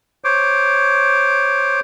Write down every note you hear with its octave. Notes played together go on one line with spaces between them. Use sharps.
C5 C#5 D6